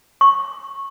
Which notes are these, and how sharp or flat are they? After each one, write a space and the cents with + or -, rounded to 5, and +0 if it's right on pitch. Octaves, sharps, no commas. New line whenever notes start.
C#6 -15